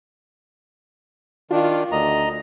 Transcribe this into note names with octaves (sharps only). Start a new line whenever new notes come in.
D#3 D4 F4
D2 D#5 A#5